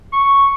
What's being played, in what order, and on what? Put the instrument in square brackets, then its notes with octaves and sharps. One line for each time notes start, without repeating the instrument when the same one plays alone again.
[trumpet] C#6